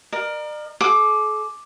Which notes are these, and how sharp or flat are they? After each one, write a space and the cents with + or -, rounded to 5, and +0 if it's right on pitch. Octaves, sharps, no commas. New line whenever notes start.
A#4 +10 D5 +45
A4 -45 D6 +5